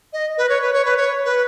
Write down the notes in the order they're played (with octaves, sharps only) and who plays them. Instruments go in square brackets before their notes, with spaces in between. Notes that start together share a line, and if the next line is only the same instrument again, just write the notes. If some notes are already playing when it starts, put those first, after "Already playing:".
[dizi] D#5
B4
C#5
B4
C#5
B4
C#5
B4